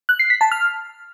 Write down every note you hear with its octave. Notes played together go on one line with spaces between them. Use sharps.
F#6
C7
B6
A5
F6